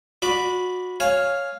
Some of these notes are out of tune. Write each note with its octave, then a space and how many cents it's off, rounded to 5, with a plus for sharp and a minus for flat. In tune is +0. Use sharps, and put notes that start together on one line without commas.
F#4 -25 D5 +0 B5 +0
C#5 +0 F5 +0 G#5 +0